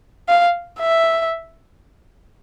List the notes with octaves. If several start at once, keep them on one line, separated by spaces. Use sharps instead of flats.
F5
E5